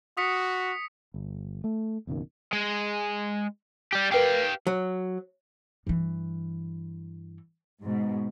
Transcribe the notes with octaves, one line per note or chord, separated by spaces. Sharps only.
F#4 D#6 B6 C#7
G1
A3
F#1 B1 F#2 D#3
G#3
G3 G4
G4 A#4 B4 F5 G5
F#3
G2 E3
G#2 B2